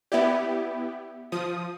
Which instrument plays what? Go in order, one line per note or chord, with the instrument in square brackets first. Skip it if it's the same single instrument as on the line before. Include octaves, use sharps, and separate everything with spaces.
[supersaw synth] B3 E4 G4 [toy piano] D5 E5 B5
[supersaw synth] F3 D#6